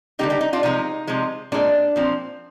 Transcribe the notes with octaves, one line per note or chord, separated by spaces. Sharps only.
D3 G3 A#3 D#4 G4
D#4 G4
D#4
D4 F4
C3 F3 G#3 D#4
C3 F3 G#3
A#2 G#3 C4 D4
A#2 F3 C4